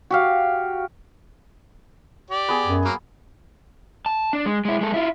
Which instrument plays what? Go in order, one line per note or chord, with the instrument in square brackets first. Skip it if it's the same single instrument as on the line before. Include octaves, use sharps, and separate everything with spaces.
[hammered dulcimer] F#4 G4 F5
[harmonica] G4 D5
[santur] B3 G#4
[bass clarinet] F#2
[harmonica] F#3 A#3
[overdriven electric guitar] A5
D4
G#3
G#3 E4
G#3 A4
E4 F4